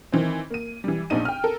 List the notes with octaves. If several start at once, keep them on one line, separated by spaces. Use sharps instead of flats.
D#3 E3 C4
A#3 D#7
E3 G3
A#1 B2 D4 D#4 D#7
G5 F6
A4 A#4